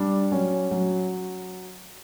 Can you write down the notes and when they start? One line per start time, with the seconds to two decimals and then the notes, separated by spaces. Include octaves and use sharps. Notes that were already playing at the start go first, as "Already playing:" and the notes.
Already playing: G3 D4
0.31 F#3 C#4
0.71 F#3